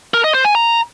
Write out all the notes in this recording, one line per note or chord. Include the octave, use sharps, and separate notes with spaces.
A#4
D#5
C5
G#5
A#5